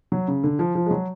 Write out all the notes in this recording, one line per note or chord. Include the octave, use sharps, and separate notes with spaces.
F#3
C#3
D3
F3
F3
G#3
F#3